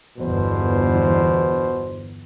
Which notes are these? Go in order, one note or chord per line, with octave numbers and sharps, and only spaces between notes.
G1 E2 B2 C5